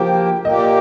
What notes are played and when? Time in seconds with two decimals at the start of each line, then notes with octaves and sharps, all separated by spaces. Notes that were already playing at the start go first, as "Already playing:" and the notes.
Already playing: F3 A#3 G4 G5
0.45 A#2 A#3 G4 D#5